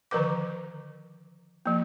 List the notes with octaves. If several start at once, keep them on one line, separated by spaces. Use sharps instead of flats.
D3 D#3 F3 A#4 B4 D6
F3 A#3